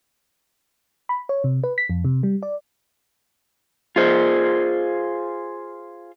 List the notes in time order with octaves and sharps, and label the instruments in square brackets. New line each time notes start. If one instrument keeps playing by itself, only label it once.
[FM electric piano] B5
C#5
C3
B4
B6
F2
C3
G3
D5
[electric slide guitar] F4 G#4 C5